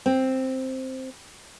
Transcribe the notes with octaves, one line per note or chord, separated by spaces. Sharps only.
C4